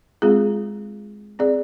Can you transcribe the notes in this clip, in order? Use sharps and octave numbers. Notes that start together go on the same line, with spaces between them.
G#3 C4 F4 G#4
C4 G#4 D5